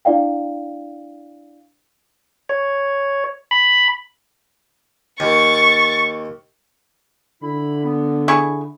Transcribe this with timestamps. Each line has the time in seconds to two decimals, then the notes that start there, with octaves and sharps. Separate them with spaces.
0.05 D4 E4 D5 F5 G5
2.49 C#5
3.51 B5
5.20 D#2 C#6 A6
7.43 D3 E4 B5
7.84 B3
8.28 E4 G#4 C#6